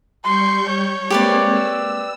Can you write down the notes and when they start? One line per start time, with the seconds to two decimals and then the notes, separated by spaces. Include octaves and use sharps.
0.24 G3 C6 C#6 G6
0.68 C#5
1.10 G#3 A#3 C4 G4 B4 D5
1.51 E6